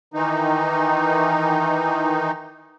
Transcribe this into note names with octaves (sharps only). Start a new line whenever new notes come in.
D#3 E3 D#4